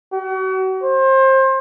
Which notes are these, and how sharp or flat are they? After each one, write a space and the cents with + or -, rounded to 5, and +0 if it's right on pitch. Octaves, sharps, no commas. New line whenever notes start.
F#4 +35
C5 +25